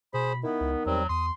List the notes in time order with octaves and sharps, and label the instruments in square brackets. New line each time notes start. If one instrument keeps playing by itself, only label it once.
[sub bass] B2 [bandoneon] G#4 C5 [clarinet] B5
[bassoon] D#3 [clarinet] B3 [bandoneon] E4
[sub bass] C#2
[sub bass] E2 [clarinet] F#3 [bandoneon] G3 C4
[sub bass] E2 [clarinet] C6 [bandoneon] D#6